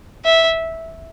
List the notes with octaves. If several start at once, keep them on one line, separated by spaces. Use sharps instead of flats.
E5